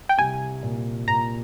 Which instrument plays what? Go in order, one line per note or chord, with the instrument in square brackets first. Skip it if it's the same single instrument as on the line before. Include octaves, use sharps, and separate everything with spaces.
[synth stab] G5
[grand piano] C2 [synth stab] G#5
[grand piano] A#2
[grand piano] A#2 [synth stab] A#5